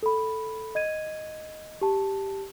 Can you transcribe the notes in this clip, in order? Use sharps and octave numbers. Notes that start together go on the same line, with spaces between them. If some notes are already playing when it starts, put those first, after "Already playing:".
A4 B5
D#5 G#6 D#7
G4 A5